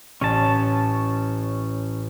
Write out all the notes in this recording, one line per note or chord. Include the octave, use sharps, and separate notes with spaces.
A1 C#4 A5